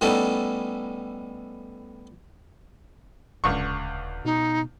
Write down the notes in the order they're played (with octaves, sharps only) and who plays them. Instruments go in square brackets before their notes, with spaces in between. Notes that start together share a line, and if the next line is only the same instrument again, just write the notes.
[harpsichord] A2 G3 B3 C#4 D#4 A4
[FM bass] D#1 [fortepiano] C#2 D3 C#6
[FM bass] B2 [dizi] D#4